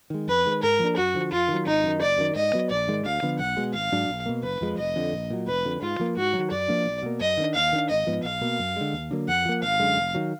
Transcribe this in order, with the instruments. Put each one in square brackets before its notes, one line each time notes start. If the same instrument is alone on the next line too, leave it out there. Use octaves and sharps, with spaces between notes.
[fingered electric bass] D#3 G#3
[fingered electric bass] F2 [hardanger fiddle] B4
[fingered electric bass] D#3 G#3
[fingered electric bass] G#2 [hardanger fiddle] A#4
[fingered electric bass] F3 A#3 D4
[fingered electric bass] F#2 [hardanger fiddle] F#4
[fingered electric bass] D3 F3
[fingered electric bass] F2 [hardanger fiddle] F4
[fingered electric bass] D#3
F#3
[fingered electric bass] G#1 [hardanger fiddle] D#4
[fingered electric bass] F#2 D#3
[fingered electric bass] F#1 [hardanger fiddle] D5
[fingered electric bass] F#2 D#3
[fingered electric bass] G#2 [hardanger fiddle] D#5
[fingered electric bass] F#3 B3
[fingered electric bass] A#1 [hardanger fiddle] D5
[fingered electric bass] G#2 D#3 G#3
[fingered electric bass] D2 [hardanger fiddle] F5
[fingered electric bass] D3 F3 B3
[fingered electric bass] B1 [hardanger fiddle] F#5
[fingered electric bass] B2 G#3
[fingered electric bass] G#1 [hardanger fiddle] F5
[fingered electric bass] G#2 F#3 D4
B1
B2 A#3
[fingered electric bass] F#1 [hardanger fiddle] B4
[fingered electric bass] F2 F3 G#3
[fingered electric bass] F1 [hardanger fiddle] D#5
[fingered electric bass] F2 D3
A#1
A#2 F#3
[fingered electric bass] F1 [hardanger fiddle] B4
[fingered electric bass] F2 D3
[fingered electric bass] G#2 [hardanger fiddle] F4
[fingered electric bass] F3 A#3
[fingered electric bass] G#2 [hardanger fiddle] F#4
[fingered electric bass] F#3
D#3
[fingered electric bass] F#2 [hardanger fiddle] D5
[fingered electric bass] F3 A#3 D4
B1
B2 A#3
[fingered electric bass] F#2 [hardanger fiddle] D#5
[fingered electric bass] D#3 A#3 D4
[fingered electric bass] D#2 [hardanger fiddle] F5
[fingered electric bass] D#3 A#3 D4
[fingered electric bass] G#1 [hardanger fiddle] D#5
[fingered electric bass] G#2 F3 B3
[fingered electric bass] B1 [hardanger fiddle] F5
[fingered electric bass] B2 A#3
F#2
D3 G#3
D#2
D3 F#3 A#3
[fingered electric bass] F2 [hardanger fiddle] F#5
[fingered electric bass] F3 A#3
[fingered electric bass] G#1 [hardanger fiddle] F5
[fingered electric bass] F#2 D3 G#3
F1
D#3 F#3